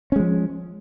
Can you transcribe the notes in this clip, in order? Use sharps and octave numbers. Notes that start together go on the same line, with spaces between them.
F3 G#3 C#4